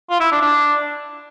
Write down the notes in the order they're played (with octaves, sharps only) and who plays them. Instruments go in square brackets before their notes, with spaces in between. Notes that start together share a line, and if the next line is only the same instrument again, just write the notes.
[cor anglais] F4
E4
D4
D4